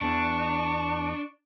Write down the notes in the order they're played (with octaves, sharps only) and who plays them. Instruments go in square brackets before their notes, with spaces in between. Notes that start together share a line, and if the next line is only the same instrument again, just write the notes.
[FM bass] E2 [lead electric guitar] D4 [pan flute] A5 [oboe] C#6